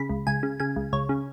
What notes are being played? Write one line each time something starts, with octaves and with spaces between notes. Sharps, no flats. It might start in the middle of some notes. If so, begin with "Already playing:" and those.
Already playing: C#3 B5
C#2
C#2 G#5
C#3
C#3 G#5
C#2
C#2 C#5
C#3